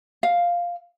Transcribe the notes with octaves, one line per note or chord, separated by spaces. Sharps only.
F5